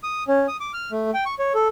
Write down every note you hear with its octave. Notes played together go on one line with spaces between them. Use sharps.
D#6
C#4
D#6
D6
F6
A3
G5
C#6
C#5
A4